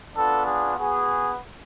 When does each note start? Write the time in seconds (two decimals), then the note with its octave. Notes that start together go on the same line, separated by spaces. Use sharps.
0.14 B3 D4 F4 A4
0.45 G#4
0.76 B3 F#4 G#4